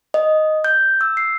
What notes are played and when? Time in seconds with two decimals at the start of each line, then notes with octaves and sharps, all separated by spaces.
0.14 D#5
0.64 G6
1.01 E6
1.17 C7